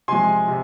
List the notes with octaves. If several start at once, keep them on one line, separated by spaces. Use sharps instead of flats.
C3 F3 G#3 G#5 C6
C3